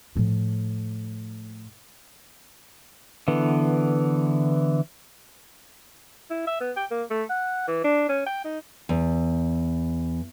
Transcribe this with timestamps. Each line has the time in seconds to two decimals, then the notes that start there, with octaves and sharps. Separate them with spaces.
0.15 A2 F3
3.28 D3 E3 B3
6.30 E4
6.47 E5
6.60 B3
6.77 G5
6.91 A#3
7.11 A3
7.30 F#5
7.68 E3
7.84 D4
8.09 C#4
8.26 G5
8.45 D#4
8.89 E2